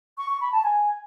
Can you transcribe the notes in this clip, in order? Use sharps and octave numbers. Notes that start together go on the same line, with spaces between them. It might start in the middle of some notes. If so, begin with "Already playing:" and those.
C#6
C#6
B5
A5
G#5